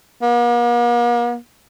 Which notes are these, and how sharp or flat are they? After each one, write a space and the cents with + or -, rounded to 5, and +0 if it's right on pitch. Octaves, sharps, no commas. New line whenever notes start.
A#3 +45